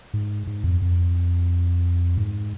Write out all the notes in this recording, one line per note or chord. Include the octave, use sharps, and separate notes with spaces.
G#2
G#2
F2
F2
G#2